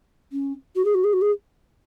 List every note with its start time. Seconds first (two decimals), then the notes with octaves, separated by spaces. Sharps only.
0.32 C#4
0.76 F#4
0.85 G#4
0.94 F#4
1.04 G#4
1.13 F#4
1.21 G#4